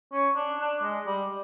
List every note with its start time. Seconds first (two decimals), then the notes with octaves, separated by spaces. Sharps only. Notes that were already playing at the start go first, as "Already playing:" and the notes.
0.12 C#4
0.36 D4
0.60 D4
0.83 G#3
1.06 G3